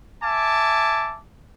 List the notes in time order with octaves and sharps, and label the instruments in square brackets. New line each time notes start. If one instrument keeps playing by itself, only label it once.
[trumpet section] E5 G#5 A5 D6